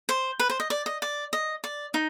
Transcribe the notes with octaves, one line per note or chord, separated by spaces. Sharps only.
C5
B4
C5
D#5
D5
D#5
D5
D#5
D5
D#4